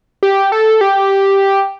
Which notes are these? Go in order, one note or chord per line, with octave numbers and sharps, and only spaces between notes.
G4
A4
G4